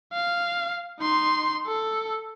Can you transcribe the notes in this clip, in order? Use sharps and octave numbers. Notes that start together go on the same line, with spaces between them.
F5
D#4 C6
A4